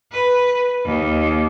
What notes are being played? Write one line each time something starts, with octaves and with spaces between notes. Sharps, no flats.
B4
D#2